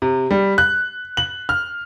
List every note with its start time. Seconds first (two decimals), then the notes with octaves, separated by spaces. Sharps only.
0.02 C3
0.31 G3
0.58 F#6
1.17 F#7
1.49 F6